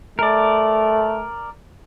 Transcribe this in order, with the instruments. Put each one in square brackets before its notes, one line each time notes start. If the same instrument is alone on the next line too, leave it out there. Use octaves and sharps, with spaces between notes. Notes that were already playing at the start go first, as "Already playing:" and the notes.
[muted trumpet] A3 [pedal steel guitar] A#4 D5